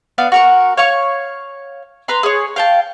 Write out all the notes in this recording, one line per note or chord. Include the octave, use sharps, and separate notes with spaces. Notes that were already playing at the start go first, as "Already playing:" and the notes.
B3 D4 F5
F#4 A#4 C#6
C#5 F5 C#6
B4 A#5 C6
G#4 C#5
F5 G5 A5